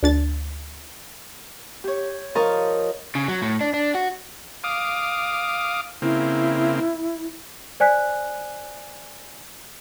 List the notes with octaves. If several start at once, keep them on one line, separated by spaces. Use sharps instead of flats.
D2 D4 A6
G4 C#5
F3 A#4 D#5 A5 C#6 F6
C#3
F#3
A2
D4
D4
F#4
F5 D6 D#6
C#3 A#3 C4 E4
C5 D5 G#5 F#6 B6